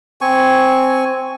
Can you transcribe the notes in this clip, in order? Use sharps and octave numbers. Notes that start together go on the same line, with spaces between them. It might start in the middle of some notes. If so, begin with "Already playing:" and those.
C4 G#5 C#6